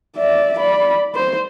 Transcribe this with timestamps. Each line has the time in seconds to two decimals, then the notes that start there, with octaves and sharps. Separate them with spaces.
0.17 D5 E5
0.58 D5 B5
1.15 C5